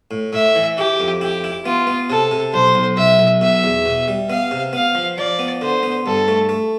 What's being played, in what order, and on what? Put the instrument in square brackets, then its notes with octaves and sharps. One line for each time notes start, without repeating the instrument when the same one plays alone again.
[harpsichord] A2
[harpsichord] A2 [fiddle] E5
[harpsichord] E3
[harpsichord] E4 [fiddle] G4
[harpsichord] F2
[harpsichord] E4 [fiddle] G4
[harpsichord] E4
[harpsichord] B3 [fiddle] F4
[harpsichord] B3
[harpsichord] C3 [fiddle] A4
[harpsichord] C3
[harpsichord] B1 [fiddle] C5
[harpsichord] B1
[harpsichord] B1 [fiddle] E5
[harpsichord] B1
[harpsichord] B2 [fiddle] E5
[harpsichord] E2
B2
G3
[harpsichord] B3 [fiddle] F5
[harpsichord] C3
[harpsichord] B3 [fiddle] F5
[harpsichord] F3
[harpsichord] F3 [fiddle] D5
[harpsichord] B3
[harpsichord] D3 [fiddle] C5
[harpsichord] B3
[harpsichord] G2 [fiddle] A4
[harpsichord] A3
A3